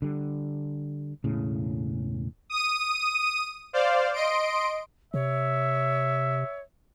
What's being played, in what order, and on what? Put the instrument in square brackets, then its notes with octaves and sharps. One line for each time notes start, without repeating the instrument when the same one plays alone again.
[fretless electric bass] D3 G3
E1 A2 C#3
[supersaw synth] D#6 D#7
C5 D5 F5
D#5 C6 D7
[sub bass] C3 [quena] C#5 [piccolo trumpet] E5